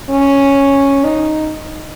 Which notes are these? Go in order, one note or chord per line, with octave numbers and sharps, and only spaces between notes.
C#4
D#4